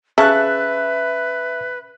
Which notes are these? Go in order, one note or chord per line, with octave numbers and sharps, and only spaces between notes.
C#3 B4 E5 A5 C#6 F#6